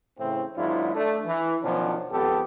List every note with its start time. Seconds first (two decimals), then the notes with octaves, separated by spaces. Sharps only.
0.19 A2 C#3 E3 C4
0.56 G#1 G#2 F#3 D4 E4 F4
0.94 A3 D4
1.25 E3
1.63 B2 D#3 F3 F#3 C#4 D4
2.11 G#1 F2 B3 G4 A4